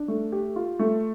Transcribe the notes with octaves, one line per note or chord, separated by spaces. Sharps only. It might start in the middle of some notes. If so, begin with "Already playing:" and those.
Already playing: D4
A3
G4
F4
A3